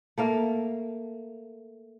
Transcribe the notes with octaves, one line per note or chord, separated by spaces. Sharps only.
A3 A#3 F5